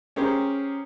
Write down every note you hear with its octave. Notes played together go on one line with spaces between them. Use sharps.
C#4 G4 G#4 A#4 C5